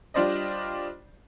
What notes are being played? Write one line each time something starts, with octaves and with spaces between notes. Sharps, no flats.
G3 D4 F4 C5 D5 D#5